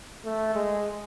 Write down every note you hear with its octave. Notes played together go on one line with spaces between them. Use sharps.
A3
G#3